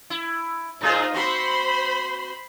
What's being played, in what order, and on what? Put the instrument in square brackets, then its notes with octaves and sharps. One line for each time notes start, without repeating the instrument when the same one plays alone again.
[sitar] E4
[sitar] A2 G#3 G#4 [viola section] D#4 F4 C5
[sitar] C4 F#4 [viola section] C5 B5 C6